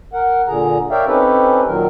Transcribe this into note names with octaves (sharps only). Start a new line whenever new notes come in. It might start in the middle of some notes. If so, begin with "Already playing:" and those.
A#4 F#5
A#2 D3 G#4 A#5
A#4 C#5 D5 E5 F5 G5
C4 C#4 D#4 G4 A4 B4
A#2 D#3 F#3 A#4